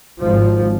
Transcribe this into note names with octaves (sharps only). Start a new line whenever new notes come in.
G#1 G#2 F3